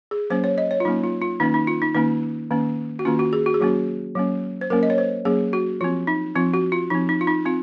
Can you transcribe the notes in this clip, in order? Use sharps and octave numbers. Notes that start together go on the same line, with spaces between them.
G#4
F#3 A#3 C#4 C5
C#5
D#5
C#5
F4
F#3 A#3 C#4 D#4
F4
F4
D#3 A#3 C#4 D#4
D#4
F4
D#4
D#3 A#3 C#4 D#4
D#3 A#3 C#4
F#4
D#3 A#3 C#4 F4
F#4
G#4
F#4
G#4
F#3 A#3 C#4 F#4
F#3 A#3 C#4
C5
F#3 A#3 C#4 A#4
D#5
C#5
C5
F#3 A#3 C#4 G#4
F#4
F3 C4 F4
D#4
F3 C4 F4
F#4
F4
F3 C4 D#4
D#4
F4
D#4
C4 F4